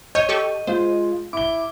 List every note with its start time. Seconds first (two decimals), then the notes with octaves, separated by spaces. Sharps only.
0.15 C#5 D#5 G6
0.29 G4 A4 C#6
0.67 G#3 F4 C5
1.33 E4 D6 G7